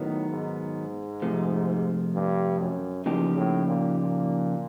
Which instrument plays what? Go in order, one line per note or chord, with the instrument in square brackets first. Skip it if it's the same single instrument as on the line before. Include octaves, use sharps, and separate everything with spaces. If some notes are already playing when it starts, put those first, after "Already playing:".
Already playing: [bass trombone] A2 [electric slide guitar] D#3 F#3 B3 D#4
[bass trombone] G#2
[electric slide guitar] F2 C3 F3 A3
[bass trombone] G2
F#2
[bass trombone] E2 [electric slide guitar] C#3 F3 A#3 D#4 G4
[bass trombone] A2
A#2
A#2